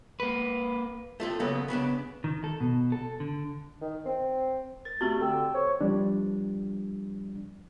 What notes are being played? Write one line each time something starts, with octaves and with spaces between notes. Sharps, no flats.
A#3 B4
A3 F4 A4
C#3 F#3 A#3 B3 A4
C#3 B3 C#4 D4
D#3
A4
B2
A4
D3
D#3
C4
A#4 A6
A3 C4 F#4 G4 A#5
D3 A4 G5 E6
C5 C#5
F3 G3 D4